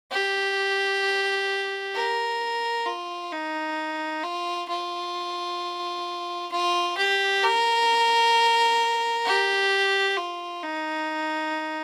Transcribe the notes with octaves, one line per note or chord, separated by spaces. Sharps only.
G4
A#4
F4
D#4
F4
F4
F4
G4
A#4
G4
F4
D#4